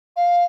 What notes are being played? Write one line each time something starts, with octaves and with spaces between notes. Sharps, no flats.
F5